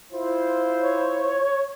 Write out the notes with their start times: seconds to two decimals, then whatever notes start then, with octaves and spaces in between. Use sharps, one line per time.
0.13 E4 F4 C5
0.79 C#5